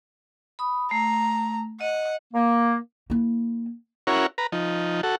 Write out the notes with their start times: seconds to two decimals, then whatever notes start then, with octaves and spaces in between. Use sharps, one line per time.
0.59 B5 D#6
0.91 A3 A#5
1.81 D#5 F#5
2.34 A#3
3.10 A#3 E4
4.07 C#4 E4 F#4 A#4 C#5
4.38 B4 A#5
4.52 F3 D#4
5.03 F#4 A4